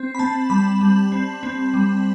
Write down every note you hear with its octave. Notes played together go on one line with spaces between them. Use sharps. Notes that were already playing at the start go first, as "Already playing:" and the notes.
Already playing: C4
B5
C4 A5
G3 B5
G3
C4
C4
G3